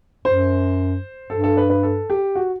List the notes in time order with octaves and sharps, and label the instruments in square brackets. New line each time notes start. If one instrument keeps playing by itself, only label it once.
[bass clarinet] F#2 [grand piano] C5
[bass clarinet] G2 [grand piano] A4
[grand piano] A4
B4
B4
A4
G4
F#4